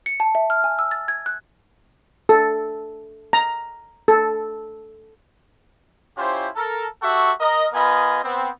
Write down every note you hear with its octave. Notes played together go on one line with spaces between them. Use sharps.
C#7
A5
E5
F6
G#5
E6
A6
G#6
F#6
A4
A#5
A4
C#4 E4 F4 G4 C5
A4 A#4
F#4 G4 A4 E5 F#5 C#6
A#4 D#5
B3 F4 A#4 D#5 G#5 B5
B3 C4